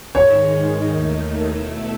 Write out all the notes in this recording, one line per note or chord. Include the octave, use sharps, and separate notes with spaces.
G#2 D#3 G#3 D#4 C#5
D#2 D#3 A3 D#4
B2 A3 E4 A4